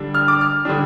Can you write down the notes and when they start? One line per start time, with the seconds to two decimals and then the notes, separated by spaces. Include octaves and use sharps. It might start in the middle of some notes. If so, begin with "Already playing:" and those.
Already playing: D3 G3 D4
0.14 F6
0.28 D6
0.41 F6
0.65 D3 G3 D4